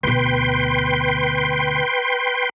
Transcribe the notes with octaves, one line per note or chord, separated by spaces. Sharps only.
D2 B2 B4 G5 C6